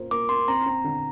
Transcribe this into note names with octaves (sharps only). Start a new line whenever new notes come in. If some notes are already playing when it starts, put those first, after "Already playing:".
Already playing: A#3 F4 C5
A#3 D6
A#3 C6
C4 A#5
C4
D3